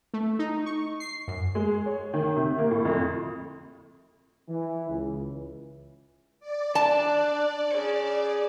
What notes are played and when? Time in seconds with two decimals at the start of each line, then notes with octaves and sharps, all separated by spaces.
0.14 A3
0.39 D#4
0.66 C#6
1.00 C7
1.28 F#2
1.55 G#3
1.86 C#5
2.14 D#3
2.36 C3
2.59 A#3
2.71 A2
2.85 F2
4.49 E3
4.89 C#2
6.40 D5
6.75 D4 A5
7.72 G#4 C#5